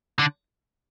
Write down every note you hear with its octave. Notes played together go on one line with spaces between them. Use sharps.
D3